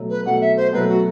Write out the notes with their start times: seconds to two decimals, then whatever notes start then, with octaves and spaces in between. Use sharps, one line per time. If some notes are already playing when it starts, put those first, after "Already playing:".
Already playing: B2 F#3 A3
0.10 B4
0.26 B2 F#3 A3 F#5
0.41 E5
0.57 C5
0.73 B2 F#3 A3 B4
0.89 F#4